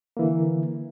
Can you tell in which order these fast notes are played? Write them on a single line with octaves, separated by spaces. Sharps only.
A#3 E3 D3